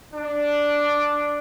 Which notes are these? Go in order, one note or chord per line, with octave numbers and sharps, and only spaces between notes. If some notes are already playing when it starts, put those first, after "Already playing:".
D4